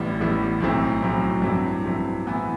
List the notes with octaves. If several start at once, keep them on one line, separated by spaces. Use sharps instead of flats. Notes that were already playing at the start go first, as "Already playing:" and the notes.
Already playing: A1 A2 G3 B3 E4
A1 A2 G3 B3 E4
B1 A2 F#3 C4 E4
B1 A2 F#3 C4 E4
G2 F#3 C4 E4
G2 F#3 C4 E4
A2 E3 B3 E4